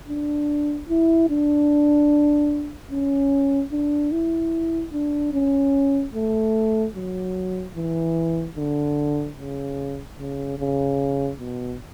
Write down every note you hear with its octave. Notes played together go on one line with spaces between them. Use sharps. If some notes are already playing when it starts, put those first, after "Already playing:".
D4
E4
D4
C#4
D4
E4
D4
C#4
A3
F#3
E3
D3
C#3
C#3
C#3
B2